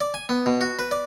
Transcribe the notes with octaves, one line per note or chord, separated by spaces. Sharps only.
D5
G#5
B3
B2
F#4
B4
D5